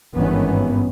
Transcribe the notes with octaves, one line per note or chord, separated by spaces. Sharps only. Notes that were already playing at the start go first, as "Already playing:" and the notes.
G#1 G2 D#3 E3 B3 C#4